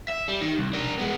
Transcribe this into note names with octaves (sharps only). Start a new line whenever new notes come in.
E5
G3
D#3
C2
D4 A#4
G#3 B3